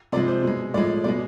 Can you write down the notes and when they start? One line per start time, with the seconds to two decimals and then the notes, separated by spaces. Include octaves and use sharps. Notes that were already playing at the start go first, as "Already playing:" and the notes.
0.12 C3 F3 G#3 D5
0.28 C5
0.43 B2 G#3
0.74 A2 F3 G#3 D5
1.04 B2 G#3 D5